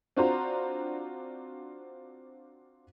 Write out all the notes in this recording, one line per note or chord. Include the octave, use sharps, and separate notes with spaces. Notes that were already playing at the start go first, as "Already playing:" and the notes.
C4 D4 F4 F#4 C5 A#5